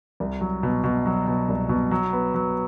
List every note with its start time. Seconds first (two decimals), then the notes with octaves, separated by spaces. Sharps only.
0.20 C2
0.41 F#3
0.63 B2
0.84 B2
1.06 F#3
1.27 B2
1.49 C2
1.69 B2
1.91 F#3
2.13 B3
2.34 F#3